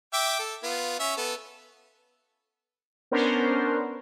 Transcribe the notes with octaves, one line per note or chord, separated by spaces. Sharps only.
E5 G5 D6
A4
B3 F4
C#4 E5
B3 A4
B3 C#4 D4 A#4 C5